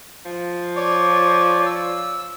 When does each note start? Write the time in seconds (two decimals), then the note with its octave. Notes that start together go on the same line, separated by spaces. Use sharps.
0.25 F3
0.76 C#5 D5
1.66 E6